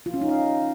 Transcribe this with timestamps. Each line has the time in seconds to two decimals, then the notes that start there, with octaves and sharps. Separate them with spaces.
0.06 F4
0.14 C#4
0.21 D#4
0.29 F5